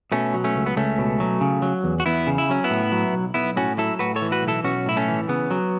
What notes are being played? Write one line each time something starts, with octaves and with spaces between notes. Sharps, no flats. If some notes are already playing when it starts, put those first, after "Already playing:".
B2 A3 C#4
F#3
A3 C#4
C#2
B3
C#2 A3 C#4
B2
F#3
C#3
F#3
E2
F#4
E2 B3 E4
C#3
E4
F#3 C#4
B3 E4
A2
F#3
B1
B1 B3 E4
A2 C#4 F#4
F#3 E4 A4
A2 F#4 B4
A4 C#5
E3
F#4 B4
B1
E4 A4
B1 C#4 F#4
A2 E4
A3 C#4
E3
C#3 B3
F#3